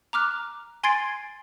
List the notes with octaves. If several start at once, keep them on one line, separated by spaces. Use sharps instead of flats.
A#5 D6 F6 F#6
G#5 C6 G#6 A6 C7 D7